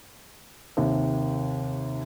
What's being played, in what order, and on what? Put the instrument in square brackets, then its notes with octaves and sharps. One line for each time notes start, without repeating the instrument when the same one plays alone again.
[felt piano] D#2 C3